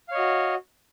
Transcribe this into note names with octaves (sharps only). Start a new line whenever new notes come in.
F#4 C#5 D#5 F5